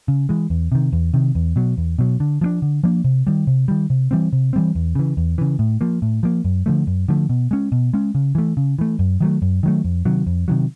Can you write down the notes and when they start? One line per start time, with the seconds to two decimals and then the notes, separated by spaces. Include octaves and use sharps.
0.08 C#3
0.29 E3 G#3
0.50 E2
0.72 C3 D#3
0.93 E2
1.14 C3 D#3
1.35 E2
1.56 B2 F#3
1.77 E2
1.99 B2 F#3
2.20 D3
2.41 F3 A#3 D4
2.62 D3
2.84 F3 A#3 D4
3.04 C3
3.27 D#3 G3
3.47 C3
3.68 D#3 G3
3.90 C3
4.11 E3 G3 C4
4.33 C3
4.53 E3 G3 C4
4.75 E2
4.95 C#3 E3
5.17 E2
5.38 C#3 E3
5.59 A2
5.81 F3 A#3
6.02 A2
6.23 F3 A#3
6.45 F#2
6.66 D3 F3 A3
6.87 F#2
7.08 D3 F3 A3
7.29 B2
7.51 G#3 C#4
7.72 B2
7.93 G#3 C#4
8.15 C#3
8.35 E3 A3
8.57 C#3
8.79 E3 A3
8.99 F#2
9.20 D#3 F#3 A3
9.42 F#2
9.63 D#3 F#3 A3
9.84 F2
10.05 C3 D#3 F#3
10.27 F2
10.48 C3 D#3 F#3